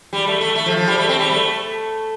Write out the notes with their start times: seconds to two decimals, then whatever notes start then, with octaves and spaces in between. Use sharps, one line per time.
0.13 G3
0.27 A3
0.41 A3
0.56 A3
0.66 F3
0.77 F3
0.88 G3
0.98 A3
1.09 C4
1.19 G3
1.30 A3